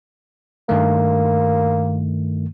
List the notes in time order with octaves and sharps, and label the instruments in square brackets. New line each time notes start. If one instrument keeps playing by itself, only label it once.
[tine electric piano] G2 D#3 A3 [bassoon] A#3